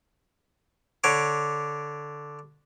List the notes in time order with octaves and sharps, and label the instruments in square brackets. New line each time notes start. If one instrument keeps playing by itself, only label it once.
[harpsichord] D3 C#5 D6